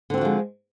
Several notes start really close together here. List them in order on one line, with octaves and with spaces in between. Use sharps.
D3 C4 F#4 F3 G#3